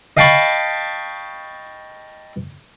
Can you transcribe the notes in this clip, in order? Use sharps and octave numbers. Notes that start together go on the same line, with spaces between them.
D#5 F5 G5 A5 B5 C#6